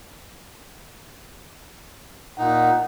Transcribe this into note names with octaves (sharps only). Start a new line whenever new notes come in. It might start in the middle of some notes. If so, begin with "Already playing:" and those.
A#2 D#4 F#5